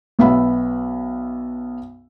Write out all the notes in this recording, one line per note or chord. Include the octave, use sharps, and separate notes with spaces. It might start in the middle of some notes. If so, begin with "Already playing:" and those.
B1 B3 E5 B5